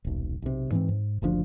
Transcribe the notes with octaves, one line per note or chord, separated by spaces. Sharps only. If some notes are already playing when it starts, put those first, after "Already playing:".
D#1 B1
B1 C3
G#2 E3 B3 C4
G#2
F#1 D2 F3 D4